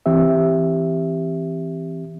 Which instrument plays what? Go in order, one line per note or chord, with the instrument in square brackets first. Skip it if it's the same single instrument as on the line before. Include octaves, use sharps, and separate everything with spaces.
[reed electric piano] E3 C4 G4 E5